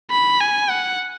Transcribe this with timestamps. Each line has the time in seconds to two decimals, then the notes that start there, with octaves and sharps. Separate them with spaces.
0.11 B5
0.40 G#5
0.70 F#5